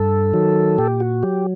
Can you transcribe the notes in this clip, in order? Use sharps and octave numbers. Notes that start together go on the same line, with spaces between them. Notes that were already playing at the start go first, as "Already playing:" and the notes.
Already playing: G2 A4
D#3 F#3
A#2 G4
F#4
F#3 G4